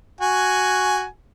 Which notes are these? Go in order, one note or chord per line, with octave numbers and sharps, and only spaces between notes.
F#4 G#5